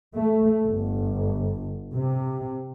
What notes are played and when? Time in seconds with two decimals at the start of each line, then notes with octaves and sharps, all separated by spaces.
0.16 A3
0.63 G1
1.94 C3